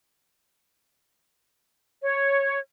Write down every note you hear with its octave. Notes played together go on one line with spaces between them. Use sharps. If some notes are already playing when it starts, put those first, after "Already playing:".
C#5